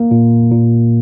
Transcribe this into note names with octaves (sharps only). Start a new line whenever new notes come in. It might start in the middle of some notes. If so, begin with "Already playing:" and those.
Already playing: A#3
A#2
A#2